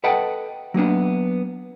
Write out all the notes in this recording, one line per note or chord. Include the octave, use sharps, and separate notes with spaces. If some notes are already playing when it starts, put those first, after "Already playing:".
A4 B4 D#5 F#5 G5 A5
F#3 A#3 B3 D4